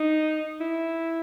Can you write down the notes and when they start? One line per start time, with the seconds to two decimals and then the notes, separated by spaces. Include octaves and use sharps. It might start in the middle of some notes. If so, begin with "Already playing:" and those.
Already playing: D#4
0.61 E4